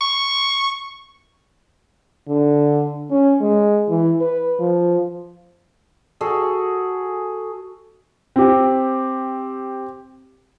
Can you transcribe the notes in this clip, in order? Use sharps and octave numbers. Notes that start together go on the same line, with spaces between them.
C#6
D3
C#4
G#3
E3
B4
F3
F#4 G#4 A4
C4 G4